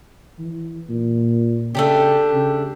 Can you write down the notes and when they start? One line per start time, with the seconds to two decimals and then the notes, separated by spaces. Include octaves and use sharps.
0.39 E3
0.90 A#2
1.75 C#3 A3 D4 G4
2.33 C#3